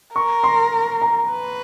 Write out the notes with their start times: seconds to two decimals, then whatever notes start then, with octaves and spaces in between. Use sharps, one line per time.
0.15 A#4 C#6
0.44 C6
1.02 A#5
1.31 B4